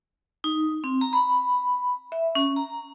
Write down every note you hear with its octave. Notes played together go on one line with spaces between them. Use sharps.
D#4
C4
A#5
B5
E5
C#4
A#5